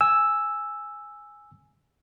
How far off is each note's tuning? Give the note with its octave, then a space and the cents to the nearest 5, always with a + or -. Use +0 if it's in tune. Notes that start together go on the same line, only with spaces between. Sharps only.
G#5 +0 E6 +0